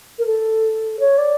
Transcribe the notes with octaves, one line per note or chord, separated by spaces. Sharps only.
A#4
A4
C#5
D5